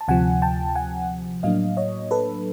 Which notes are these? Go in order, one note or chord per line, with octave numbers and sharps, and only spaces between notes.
A5
D2 C3 F3 F#5 G#5
G5 A5
F#5 G#5
A2 F#3 A#3 D4 D#5 F5
C#5 D#5
A4 B4